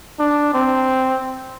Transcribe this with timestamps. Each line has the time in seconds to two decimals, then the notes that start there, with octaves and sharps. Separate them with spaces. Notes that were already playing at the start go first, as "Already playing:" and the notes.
0.19 D4
0.54 C4